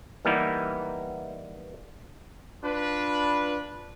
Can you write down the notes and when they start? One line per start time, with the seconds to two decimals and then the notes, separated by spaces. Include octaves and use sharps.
0.25 E3 G3 A#3 B3 D#4 E4
2.64 D4 F4 B4